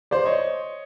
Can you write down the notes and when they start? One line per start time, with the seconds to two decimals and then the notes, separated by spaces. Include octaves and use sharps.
0.11 C5 D5
0.25 C#5 D#5